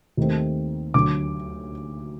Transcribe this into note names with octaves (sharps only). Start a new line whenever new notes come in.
D#2 D#3 A3 C4
D2 D3 F#3 D6